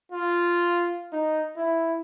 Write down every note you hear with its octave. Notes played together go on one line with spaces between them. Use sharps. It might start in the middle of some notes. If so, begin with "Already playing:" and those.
F4
D#4
E4